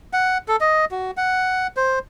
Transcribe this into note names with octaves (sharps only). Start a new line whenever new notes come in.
F#5
A4
D#5
F#4
F#5
C5